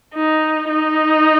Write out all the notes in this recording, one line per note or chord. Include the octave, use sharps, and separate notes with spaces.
D#4
D#4